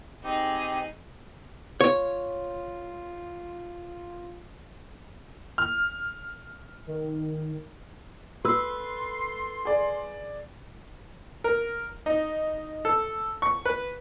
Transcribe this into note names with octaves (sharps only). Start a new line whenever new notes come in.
C4 D#4 G4 G#4
F4 C#5
F6
D#3
F#4 A4 B4 C6 E6
G#4 D5
A#4
D#4
A4
C#6
B4